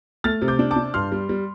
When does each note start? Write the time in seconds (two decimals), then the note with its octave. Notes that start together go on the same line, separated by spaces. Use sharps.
0.24 A3 F6 A6
0.41 C3
0.48 D6 G6
0.59 D4
0.71 A5 D6
0.76 D4
0.94 G2 C6 F6
1.12 G3
1.29 G3